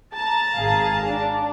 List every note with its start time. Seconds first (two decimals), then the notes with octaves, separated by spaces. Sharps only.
0.14 A5 A#5
0.55 G#1 G#4 F5
1.05 D4